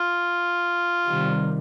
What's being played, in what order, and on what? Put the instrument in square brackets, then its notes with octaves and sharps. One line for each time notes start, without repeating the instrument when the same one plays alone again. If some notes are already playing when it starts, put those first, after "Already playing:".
Already playing: [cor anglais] F4
[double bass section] C3 D#3 G3